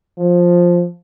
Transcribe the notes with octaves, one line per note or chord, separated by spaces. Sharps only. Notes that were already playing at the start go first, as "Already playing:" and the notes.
F3